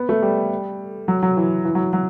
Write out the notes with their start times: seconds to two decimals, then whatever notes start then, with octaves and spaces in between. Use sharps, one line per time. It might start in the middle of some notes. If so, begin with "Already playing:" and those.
Already playing: B3
0.09 A3
0.22 G3
1.08 F#3
1.23 F#3
1.37 E3
1.65 E3
1.75 F#3
1.93 F#3